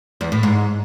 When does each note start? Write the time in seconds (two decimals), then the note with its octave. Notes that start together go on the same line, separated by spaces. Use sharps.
0.21 E2
0.32 A2
0.43 G#2